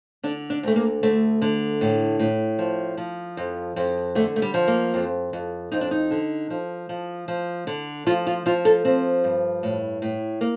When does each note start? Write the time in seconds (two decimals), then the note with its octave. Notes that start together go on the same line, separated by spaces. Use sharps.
0.23 D3 D4
0.50 D4
0.63 D2 A3
0.76 A#3
1.03 D2 A3
1.42 D3
1.81 A2
2.19 A2
2.58 F3
2.97 F3
3.37 F2
3.76 F2
4.15 D3 A3
4.36 A3
4.42 G3
4.54 F3
4.68 A#3
4.94 F2
5.33 F2
5.72 F2 D#4
5.81 D4
5.91 D#4
6.11 D3
6.50 F3
6.89 F3
7.28 F3
7.67 D3
8.06 F3 F4
8.27 F4
8.46 F3 F4
8.65 A4
8.85 F3 C4
9.24 G2
9.63 A2
10.02 A2
10.41 A#3